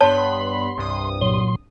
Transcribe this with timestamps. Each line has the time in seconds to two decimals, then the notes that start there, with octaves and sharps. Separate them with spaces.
0.01 G2 B3 C#5 A5 B5 C6
0.77 C2 G2 D#6
1.21 A#2 F#3 C6